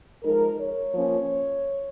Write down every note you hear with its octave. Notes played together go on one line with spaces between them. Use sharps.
F3 G#3 D#4 A#4
C#5
F3 A#3 C#4